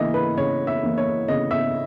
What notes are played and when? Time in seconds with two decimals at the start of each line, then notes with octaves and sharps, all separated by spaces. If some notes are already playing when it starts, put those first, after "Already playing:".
Already playing: C#3 E3 A#3 D#5 E5
0.14 B4
0.37 C#3 C#5
0.67 E5
0.83 E3 A#3
0.98 C#5
1.28 C#3 D#5
1.51 E5